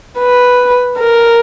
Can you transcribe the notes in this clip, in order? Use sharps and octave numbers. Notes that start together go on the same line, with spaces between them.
B4
A#4